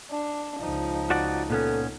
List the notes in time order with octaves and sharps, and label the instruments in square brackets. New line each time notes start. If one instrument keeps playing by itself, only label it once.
[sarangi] D4
[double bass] C#2 D#4 [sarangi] F3
[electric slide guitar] F#4 D5 F#5
[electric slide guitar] A#2 B3 C#4 [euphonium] A4